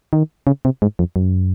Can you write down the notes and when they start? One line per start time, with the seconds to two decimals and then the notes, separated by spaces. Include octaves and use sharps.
0.13 D#3
0.47 C#3
0.65 C3
0.82 G#2
0.99 F2
1.16 F#2